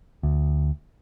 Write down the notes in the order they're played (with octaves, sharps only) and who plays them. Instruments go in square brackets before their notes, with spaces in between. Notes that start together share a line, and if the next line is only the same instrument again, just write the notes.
[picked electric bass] D2